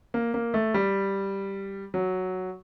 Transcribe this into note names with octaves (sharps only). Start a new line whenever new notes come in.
A#3
A#3
A3
G3
F#3